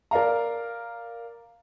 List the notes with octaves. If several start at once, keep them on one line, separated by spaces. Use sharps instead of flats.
A#4 D5 F5 A#5